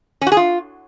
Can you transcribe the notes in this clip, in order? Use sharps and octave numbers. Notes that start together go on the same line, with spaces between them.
C#4
F#4
G#4
F4